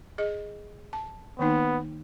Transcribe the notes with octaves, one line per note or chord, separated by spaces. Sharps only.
G#4 D#5
A5
D#3 A#3 B3 D#4